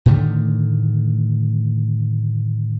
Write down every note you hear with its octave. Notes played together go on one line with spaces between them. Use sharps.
A2 D3 D#3 A3